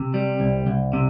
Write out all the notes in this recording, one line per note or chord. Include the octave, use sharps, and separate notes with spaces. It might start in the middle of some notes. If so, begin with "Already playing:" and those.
Already playing: C3
G3
C2
C2
C3